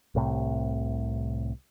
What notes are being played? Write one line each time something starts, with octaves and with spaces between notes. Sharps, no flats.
C2 A2 C3